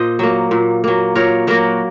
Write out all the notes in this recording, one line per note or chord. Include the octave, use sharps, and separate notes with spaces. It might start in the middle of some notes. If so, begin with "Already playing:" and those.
Already playing: A#2 C5 D#5
F#3 A#3
A#2
F#3 A#3
A#2 A#4 C#5
F#3 A#3 F#4 A#4